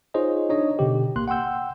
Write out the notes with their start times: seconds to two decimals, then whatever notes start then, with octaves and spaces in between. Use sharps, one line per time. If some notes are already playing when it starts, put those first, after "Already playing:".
0.14 D#4 F4 G#4 C5 C#5 D#5
0.49 D4 D#4 C#5 D#5
0.79 B2 D3 G4
1.16 A1 A#3 C6 F#6
1.28 F#5 G5 C6 E6 G6